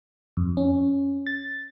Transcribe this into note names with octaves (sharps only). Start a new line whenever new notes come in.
F2
C#4
A6